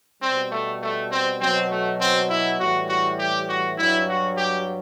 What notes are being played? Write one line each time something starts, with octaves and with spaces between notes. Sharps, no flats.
B2 G3 C4
A3
A3
C4
B2 F#3 C4
A3
C4
E4
A2 E3 G3 F#4
F#4
G4
F#4
G2 F#3 E4
F#4
G4